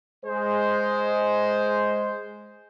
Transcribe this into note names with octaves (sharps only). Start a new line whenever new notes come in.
G#3 C5